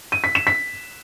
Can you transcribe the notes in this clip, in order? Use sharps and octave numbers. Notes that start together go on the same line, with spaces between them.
D#7
B6
E7
B6